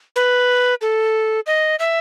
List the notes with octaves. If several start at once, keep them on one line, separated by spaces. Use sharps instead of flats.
B4
A4
D#5
E5